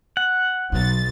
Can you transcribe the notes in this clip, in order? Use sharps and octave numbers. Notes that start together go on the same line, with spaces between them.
F#5
B1 F#3 A6